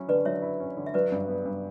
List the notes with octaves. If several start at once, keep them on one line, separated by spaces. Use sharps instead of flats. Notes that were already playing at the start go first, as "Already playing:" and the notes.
Already playing: F#3 C#4 E4
D3 B4 D5
F#3 C#5 E5
E4
C#4
D3
E5
F#3 B4 D5
G2
B3
G2